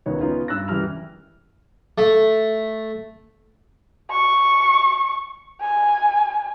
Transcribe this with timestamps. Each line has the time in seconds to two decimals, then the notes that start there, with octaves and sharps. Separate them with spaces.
0.06 E1 C#2 D#3 B3 C#5
0.21 B3 C#4 D#4 F4
0.48 G2 E6 F#6 A#6
0.68 E1 F#2 E3 G3 F6 F7
1.98 A3
4.11 C#6
5.61 G#5